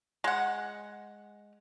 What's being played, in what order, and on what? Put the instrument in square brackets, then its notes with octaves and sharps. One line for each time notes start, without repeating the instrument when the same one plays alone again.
[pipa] G#3 F#5